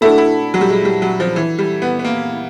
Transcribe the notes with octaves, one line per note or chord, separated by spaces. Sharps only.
A3 D4 E4 F#4 A4
E4
F#3
G3
G#3
G3
F#3
F3
E3
G3
B3
B3
A#3